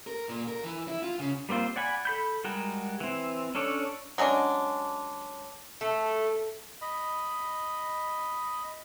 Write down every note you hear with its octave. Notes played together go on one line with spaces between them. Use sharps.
A#4
A#2
A#4
E3
E4
F4
C#3
G3 A#3 C4 F4 C5
D5 F#5 G#5 B5
A4 B5 G6
G3 G#3 F#4 A#4
E3 C4
C#4 D4 A4 C#5 D5
F#3 G#3 C#4 D4
A3 A4
D#5 B5